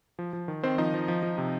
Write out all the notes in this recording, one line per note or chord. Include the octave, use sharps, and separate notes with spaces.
F3
F3
D#3
D#3 C4 C5
F3 D#4 D#5
F3
F3
F3
C3